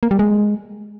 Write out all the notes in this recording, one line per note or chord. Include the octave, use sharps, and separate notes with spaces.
A#3
G3
G#3